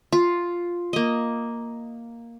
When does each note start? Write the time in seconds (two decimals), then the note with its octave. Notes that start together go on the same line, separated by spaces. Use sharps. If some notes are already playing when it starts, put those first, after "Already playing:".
0.12 F4
0.93 A#3 D#5